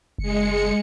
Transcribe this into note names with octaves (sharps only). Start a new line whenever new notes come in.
F#1 G#3 C#7